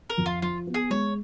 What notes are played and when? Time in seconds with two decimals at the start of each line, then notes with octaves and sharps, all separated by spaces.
0.10 A#4
0.18 F2
0.26 F4
0.42 F3 F4
0.67 B3
0.74 G#4
0.90 G#3 C#5